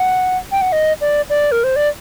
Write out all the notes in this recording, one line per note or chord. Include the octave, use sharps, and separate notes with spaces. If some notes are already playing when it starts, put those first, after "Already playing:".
Already playing: F#5
G5
F#5
D#5
D5
D5
A#4
C5
D5